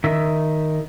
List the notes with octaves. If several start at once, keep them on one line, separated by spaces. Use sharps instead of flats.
D#3 E5